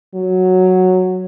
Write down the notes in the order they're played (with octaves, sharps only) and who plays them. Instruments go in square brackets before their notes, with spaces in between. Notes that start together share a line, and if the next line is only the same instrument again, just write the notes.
[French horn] F#3